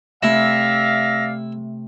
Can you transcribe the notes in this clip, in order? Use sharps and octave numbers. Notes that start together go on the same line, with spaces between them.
C3 A3 E4 D5 E5 F5 A#6